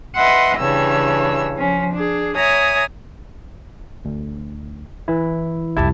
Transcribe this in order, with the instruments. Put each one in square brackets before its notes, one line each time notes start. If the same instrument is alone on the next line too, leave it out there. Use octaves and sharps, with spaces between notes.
[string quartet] B4 D#5 E5 F#5 C6
G2 C#3 E3 C#5 E6
F3 C#4
D4 G#4
C#5 E5 G#5 A#5 D#6
[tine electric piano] D2
E3 E4
[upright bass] C2 F2 [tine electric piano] E4 G4 A5